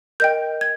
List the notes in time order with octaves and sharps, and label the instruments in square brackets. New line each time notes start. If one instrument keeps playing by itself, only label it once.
[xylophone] A#4 D#5 G5 G6
G#6